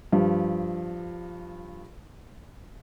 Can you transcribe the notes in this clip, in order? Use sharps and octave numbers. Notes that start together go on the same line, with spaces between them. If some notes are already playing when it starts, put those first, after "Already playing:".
G2 F3